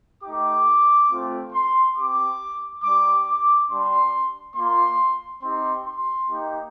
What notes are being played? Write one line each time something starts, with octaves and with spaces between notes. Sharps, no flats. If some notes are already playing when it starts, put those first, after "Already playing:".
A3 D#4 G4 D6
A3 C4 F4
C6
C4 G4 D6
G3 D4 G4 D6
D6
G3 D4 G4 C6
A#3 F4 C6
C4 D#4 G4 C6
C6
A#3 D#4 G4